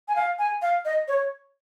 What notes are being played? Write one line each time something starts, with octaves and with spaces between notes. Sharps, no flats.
G#5
F5
G#5
F5
D#5
C#5